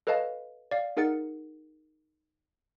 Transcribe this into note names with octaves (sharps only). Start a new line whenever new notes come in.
A4 B4 C#5 D#5 F5 A5
D5 F5
D#4 G#4 A#4 F#5 A6 C#7